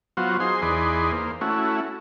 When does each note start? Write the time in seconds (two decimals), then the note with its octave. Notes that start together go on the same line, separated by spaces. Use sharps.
0.17 F#3 B3 F4 F#4 C5
0.40 D#4 G#4 C5 C6
0.62 E2 D#4 G#4 B4 D5 C6
1.12 A#3 C5
1.41 A3 C#4 E4 F#4